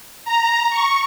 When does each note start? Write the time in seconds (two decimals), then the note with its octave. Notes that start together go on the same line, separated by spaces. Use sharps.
0.25 A#5
0.70 C#6